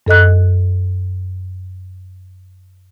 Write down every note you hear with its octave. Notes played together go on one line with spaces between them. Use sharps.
F#2 A4 D#5 F#6